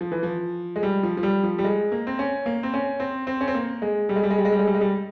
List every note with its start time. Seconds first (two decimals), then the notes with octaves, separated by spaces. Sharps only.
0.01 F3
0.12 E3
0.23 F3
0.76 G#3
0.83 G3
1.03 F3
1.17 F3
1.23 G3
1.43 F3
1.59 G3
1.64 G#3
1.92 A#3
2.07 C4
2.19 C#4
2.46 A#3
2.63 C4
2.74 C#4
3.00 C4
3.27 C4
3.41 C#4
3.48 C4
3.55 A#3
3.82 G#3
4.09 G3
4.16 G#3
4.23 G3
4.31 G#3
4.38 G3
4.45 G#3
4.52 G3
4.59 G#3
4.67 G3
4.75 G#3
4.81 G3